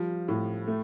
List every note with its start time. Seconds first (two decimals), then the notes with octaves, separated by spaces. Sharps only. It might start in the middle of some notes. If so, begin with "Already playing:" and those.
Already playing: F3 G3
0.28 A2
0.67 A3